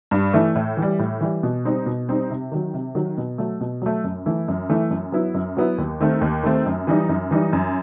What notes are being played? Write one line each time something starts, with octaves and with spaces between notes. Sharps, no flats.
G2
E3 A3 E4
A2
E3
G3
A2
E3 G3
B2
G3 C4 D#4
B2
G3 C4 D#4
C3
D#3 F#3
C3
D#3 F#3
B2
F#3 A3
B2
F#3 A3
F#2
E3 A3 E4
F#2
E3 A3 E4
F#2
F#3 B3 E4
F#2
F#3 B3 E4
D#2
D#3 A3 C4
D#2
D#3 A3 C4
F#2
E3 G3 D#4
F#2
E3 G3 D#4
F#2